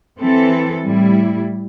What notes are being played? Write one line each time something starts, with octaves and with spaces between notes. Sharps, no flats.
E3 C4 A4
A2 G3 E4